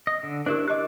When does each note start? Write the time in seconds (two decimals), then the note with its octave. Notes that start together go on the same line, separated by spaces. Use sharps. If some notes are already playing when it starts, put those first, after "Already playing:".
0.07 D#5
0.23 D3
0.46 D4 E4 G4 A#4 C5
0.68 G4 D#5 D6 F#6